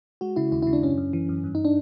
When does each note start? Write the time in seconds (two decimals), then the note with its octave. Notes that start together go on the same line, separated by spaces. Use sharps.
0.21 G#3 F#4
0.36 C#3 E4
0.52 D#2 E4
0.62 C#3 E4
0.73 D4
0.82 F#2 C#4
0.97 F#2
1.13 E3
1.29 F#2
1.44 G2
1.55 D#4
1.65 D4